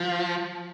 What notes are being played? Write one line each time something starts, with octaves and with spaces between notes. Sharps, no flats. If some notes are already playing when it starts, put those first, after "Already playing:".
Already playing: F3